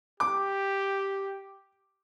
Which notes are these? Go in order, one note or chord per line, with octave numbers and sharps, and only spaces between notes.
G4 D6